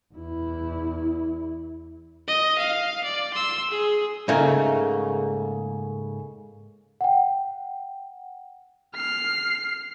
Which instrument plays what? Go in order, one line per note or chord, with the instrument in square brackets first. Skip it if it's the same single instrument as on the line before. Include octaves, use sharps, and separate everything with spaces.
[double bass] E2 E4
[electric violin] D#5
F5
D5
C6 E6
G#4
[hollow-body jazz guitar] G#2 C#3 A3 A#3
[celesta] F#5 G5
[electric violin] F6 C7